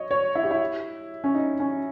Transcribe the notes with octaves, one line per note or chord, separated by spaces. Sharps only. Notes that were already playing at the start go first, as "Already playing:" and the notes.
Already playing: C#5 D#5
C#5
E4
G4
E4
C#4
D#4
C#4